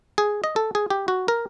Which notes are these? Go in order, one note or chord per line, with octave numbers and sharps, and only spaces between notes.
G#4
D#5
A4
G#4
G4
F#4
A#4